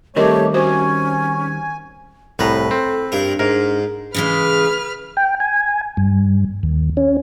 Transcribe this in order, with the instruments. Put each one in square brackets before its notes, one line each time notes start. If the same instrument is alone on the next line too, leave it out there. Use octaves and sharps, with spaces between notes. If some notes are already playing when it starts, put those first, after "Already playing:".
[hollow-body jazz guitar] D#3 G3 C4 [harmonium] A3 C#5 [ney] G4 [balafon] A#4 D#5
[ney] C#4 [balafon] F#4 C5 [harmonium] G#5
[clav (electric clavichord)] C2 A2 A#5 [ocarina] A4 [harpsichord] B4
[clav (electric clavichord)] C4
[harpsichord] G2 A#4 [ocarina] D4
[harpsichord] G#2 [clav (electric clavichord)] A#4
[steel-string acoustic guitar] C#3 E3 G#3 [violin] B4 F6
[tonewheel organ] G5
G#5
G2
D#2
C#4